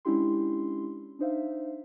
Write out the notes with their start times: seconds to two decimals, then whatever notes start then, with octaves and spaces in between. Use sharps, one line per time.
0.05 G#3 C#4 D4 E4 G4 C6
1.19 D4 D#4 C5 E5 F5